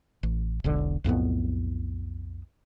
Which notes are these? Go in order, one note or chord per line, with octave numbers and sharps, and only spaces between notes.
A1
E1 B1 D3
B1 F2 A2 B3